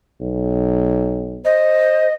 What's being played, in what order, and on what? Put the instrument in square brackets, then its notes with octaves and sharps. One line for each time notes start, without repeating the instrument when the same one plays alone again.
[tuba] B1
[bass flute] C5 [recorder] D#5